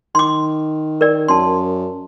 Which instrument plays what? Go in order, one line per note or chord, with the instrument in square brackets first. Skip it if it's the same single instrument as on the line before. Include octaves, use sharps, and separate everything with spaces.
[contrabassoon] D#3 [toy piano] C6 D6
[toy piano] A#4 D5
[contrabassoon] F#2 [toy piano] A5 C6